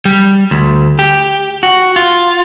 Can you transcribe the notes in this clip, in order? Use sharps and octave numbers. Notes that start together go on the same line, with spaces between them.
G3
D2
G4
F#4
F4